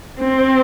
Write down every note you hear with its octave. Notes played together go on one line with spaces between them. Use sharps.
C4